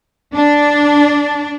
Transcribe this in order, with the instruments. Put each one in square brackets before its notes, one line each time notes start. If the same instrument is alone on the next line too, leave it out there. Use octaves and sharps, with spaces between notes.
[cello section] D4